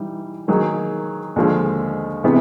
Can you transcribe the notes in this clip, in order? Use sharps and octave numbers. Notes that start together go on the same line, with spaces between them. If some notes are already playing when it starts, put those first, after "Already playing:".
Already playing: E3 G3 D#4
D#3 F#3 A#3 D#4 G#4
D#2 D3 F3 G#3
C3 E3 G#3 B3